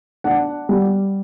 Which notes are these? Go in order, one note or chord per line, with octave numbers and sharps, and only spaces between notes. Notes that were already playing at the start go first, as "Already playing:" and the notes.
D4 F#5
G3